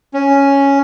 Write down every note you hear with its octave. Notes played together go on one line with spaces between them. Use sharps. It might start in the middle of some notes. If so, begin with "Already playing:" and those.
C#4